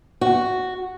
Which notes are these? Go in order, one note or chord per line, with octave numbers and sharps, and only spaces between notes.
F#4